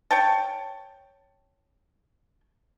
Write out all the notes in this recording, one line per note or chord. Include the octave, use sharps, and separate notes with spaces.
C#5 G5 A5